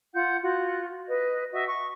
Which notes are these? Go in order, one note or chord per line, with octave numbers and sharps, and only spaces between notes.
F4 F#5 G6
F4 F#4
B4 D#5
F#4 D#5 E5
C#6